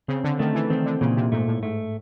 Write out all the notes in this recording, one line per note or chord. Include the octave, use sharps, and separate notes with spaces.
C#3 C4
D3
D#3 A3
E3
D#3 C4
D3
A#2 C#3
C3
G#2 A3
A2
G#2 A3